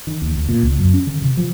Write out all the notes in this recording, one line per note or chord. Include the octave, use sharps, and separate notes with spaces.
D#3
D#2
D2
A#2
C#2
F#2
C#4
D3
C3
F3